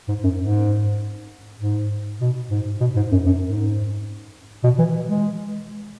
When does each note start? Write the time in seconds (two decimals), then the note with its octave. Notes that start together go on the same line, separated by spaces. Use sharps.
0.08 G#2
0.24 F#2
0.38 G#2
1.60 G#2
2.21 B2
2.51 G#2
2.81 B2
2.96 G#2
3.12 F#2
3.26 F#2
3.42 G#2
4.64 B2
4.79 E3
5.09 G#3